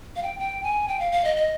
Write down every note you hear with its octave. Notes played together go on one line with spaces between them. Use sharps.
F5
G5
G5
G#5
G5
F5
F5
D#5
D#5